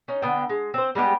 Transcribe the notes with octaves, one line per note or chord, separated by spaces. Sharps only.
C#4 D#4
D3 B3 G5
G#3
C4 C5
G3 G#3 B3 G4